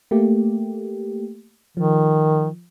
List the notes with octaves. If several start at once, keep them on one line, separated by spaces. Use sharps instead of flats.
A3 A#3 G4
D#3 F3